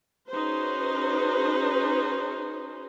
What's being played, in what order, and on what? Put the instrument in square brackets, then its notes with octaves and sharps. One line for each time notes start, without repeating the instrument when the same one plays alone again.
[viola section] C#4 D#4 F#4 G#4 B4 C5